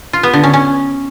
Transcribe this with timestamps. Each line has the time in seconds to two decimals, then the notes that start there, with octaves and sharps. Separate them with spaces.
0.13 F4
0.23 B3
0.33 D3
0.43 C#4
0.54 C#4